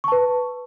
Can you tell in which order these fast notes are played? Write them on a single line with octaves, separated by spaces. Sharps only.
C#6 A5 B4